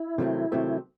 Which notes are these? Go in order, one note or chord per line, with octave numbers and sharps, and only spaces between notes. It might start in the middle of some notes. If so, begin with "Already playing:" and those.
Already playing: E4
C3 D#3 F#3 A3 C4
C3 D#3 F#3 A3 C4